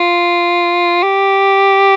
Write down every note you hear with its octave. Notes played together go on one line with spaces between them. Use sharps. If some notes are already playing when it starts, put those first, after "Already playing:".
Already playing: F4
G4